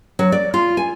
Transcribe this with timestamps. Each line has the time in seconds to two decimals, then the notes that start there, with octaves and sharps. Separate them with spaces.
0.19 F#3
0.32 D5
0.54 F4
0.77 G#5